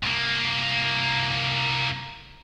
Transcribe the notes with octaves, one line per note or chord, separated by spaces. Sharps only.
C2 A#3